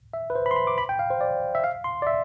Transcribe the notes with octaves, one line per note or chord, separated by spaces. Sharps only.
E5
B4
C5
B5
C6
B5
D6
B5
G5
F5
C5
D5
E5
F5
C6
D5
E5